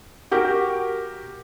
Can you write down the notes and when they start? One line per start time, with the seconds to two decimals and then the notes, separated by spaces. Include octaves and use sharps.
0.31 F#4 G4 A#4